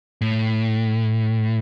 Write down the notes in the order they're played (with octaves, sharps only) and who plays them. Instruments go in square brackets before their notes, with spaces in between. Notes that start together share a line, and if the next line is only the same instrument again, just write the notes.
[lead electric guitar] A2